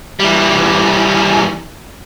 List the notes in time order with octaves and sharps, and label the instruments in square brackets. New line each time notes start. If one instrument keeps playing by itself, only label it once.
[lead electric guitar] E3 G3